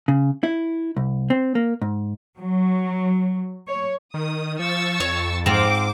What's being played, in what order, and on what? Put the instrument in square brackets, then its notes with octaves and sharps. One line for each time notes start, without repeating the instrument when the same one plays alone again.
[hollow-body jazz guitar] C#3
E4
C2
C4
A#3
G#2
[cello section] F#3
C#5
[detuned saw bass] D#3 [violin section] D#6
[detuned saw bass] F3 [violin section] C#6 E6 A6
[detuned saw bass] F2 [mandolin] C#5
[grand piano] G#2 [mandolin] C4 F4 [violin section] C5 D6